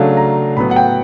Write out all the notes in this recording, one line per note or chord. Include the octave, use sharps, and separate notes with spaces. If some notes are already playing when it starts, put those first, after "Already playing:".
Already playing: C#3 F#3 A3 D4 F5
A#5
A2 F#3 B3 B5
F#5
G5